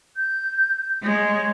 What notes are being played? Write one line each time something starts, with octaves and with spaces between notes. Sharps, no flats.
G6
G#3 C#5